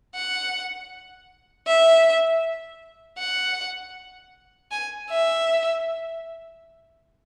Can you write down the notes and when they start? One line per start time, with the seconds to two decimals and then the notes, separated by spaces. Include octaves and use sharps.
0.16 F#5
1.67 E5
3.19 F#5
4.72 G#5
5.10 E5